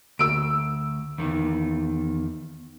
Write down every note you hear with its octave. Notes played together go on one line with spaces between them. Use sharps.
D2 E6 D7
E2 D#3